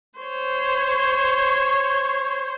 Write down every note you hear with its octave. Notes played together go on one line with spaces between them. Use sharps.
C5 C#5